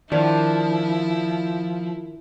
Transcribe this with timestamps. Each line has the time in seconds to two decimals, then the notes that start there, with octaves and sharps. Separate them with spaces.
0.12 D#3 F3 D4 E4